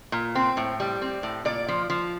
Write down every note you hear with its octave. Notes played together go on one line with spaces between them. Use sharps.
A#2
C4
A2
G3
C4
A2
A#2 D5
F3
F3